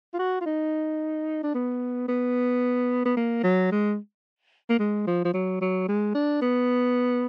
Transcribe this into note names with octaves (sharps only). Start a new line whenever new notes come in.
F4
F#4
F4
D#4
D4
B3
B3
B3
A#3
F#3
G#3
A#3
G#3
F3
F3
F#3
F#3
G#3
D4
B3